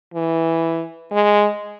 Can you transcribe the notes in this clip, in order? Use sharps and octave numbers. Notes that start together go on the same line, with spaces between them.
E3
G#3